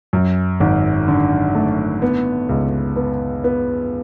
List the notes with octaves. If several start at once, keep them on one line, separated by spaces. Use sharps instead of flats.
F#2
G#1
D3
A3
B3
C#2
B3
B3